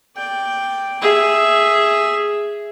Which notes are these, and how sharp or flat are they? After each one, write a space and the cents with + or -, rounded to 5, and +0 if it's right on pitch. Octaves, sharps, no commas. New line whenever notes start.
D5 +0 G5 +0
G#4 +0 E5 +0